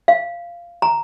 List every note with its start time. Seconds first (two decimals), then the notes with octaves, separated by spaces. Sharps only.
0.08 F5
0.82 A#5